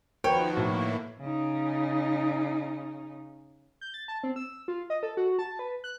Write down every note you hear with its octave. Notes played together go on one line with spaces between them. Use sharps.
D#3 F3 F#4 A#4 B4 C#5 G5
A2 A#3 E4
C#3 D#4
G6
A6
A5
C4
E6
F4
D#5
A4
F#4
A5
B4
F#6